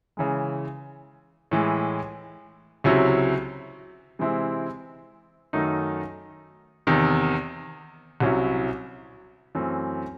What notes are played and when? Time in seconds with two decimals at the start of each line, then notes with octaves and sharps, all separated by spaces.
0.17 C#3 E3 G#3
1.51 A2 E3 G#3
2.84 C#2 C3 F#3 C#4 E4
4.19 C3 E3 G#3 C4 E4
5.53 F#2 D#3 A3 D#4
6.87 E2 C3 D#3
8.20 C2 C3 F#3 C#4 E4
9.55 F#2 E3 A3 C4